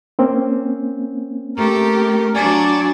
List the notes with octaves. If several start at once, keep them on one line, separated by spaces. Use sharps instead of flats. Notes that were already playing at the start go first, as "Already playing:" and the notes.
A#3 C4 C#4
A3 G4 A#4
F#3 D4 D5 G#5